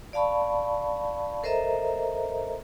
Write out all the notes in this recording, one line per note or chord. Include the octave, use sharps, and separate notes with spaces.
D5 F5 A5 B5 C#6
A4 A#4 C5 D#5 E5 A#5